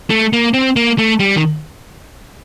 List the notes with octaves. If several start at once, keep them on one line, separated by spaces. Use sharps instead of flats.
A3
A#3
C4
A#3
A3
G3
D#3